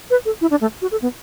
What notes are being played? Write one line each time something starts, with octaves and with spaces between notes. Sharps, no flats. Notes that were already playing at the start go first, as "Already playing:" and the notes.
B4
A4
E4
D4
A3
F#4
A4
B3